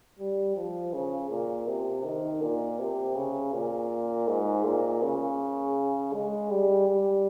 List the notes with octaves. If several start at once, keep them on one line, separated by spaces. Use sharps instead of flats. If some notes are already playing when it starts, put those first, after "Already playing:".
G3
F3
C#3
A#2
C3
D#3
A#2
C3
C#3
A#2
G#2
A#2
C#3
G#3
G3
G3